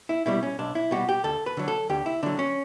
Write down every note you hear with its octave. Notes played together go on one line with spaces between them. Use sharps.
E4
B2 G3 E4
C#4
B1 D4
E4
B2 G3 F#4
G4
D2 A4
B4
D3 F#3
A4
D2 G4
E4
D3 F#3 D4
C#4